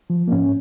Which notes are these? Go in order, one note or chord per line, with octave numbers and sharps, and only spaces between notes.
F3
A#3
G#2 C#4